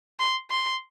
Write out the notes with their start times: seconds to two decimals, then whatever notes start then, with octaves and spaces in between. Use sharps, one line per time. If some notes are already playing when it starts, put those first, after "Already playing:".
0.20 C6
0.51 C6